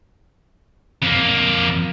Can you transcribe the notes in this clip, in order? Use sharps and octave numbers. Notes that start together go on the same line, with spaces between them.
F2 A#3